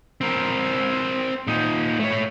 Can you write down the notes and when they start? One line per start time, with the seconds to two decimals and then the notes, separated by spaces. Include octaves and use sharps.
0.21 C4 A#4
1.47 A#2 D#4
2.00 A3 C#5